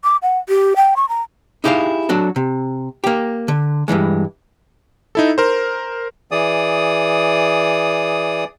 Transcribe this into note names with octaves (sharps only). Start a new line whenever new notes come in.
D6
F#5
G4
G5
C#6
A#5
D#4 E4 G4 G#4 D#5 F5
F#3 D4 F#4 A4
C3
A#3 G4
D3
G2 D3 E3 G#3
D#4 E4 A4
A#4 C5
E3 G#4 D5 D#6